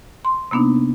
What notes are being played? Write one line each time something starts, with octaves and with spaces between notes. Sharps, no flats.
C6
C3 A#3 B3 D4 D#4